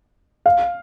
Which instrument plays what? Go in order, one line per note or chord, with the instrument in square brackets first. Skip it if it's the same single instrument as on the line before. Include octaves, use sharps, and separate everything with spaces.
[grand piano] F5